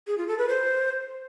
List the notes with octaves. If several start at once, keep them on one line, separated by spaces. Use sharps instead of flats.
G#4
F4
A4
B4
C5